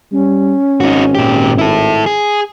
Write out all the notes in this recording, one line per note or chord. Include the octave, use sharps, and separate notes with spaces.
G3 C#4
G#1 D#4 F#4
A#2 G4
E4 A4
G#4